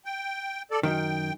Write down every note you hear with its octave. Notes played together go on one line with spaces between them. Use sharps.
G5
A4 D5
F#2 D#3 G5